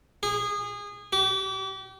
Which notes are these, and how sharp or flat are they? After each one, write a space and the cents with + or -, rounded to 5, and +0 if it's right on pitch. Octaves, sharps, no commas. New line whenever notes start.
G#4 -25
G4 -35